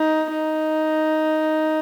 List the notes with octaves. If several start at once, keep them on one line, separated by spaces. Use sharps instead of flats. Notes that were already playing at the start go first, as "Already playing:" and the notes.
Already playing: D#4
D#4